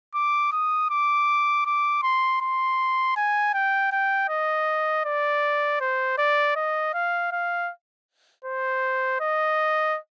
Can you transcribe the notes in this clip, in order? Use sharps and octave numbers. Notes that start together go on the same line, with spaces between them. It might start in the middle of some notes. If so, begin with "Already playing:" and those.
D6
D#6
D6
D6
C6
C6
G#5
G5
G5
D#5
D5
C5
D5
D#5
F5
F5
C5
D#5